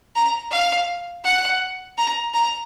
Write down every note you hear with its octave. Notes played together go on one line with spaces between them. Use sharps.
A#5
F5
F#5
A#5
A#5